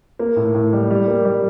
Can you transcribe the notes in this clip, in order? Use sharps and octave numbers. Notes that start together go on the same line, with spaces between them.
A#3
A2
A2
G3
G3
A#3
G3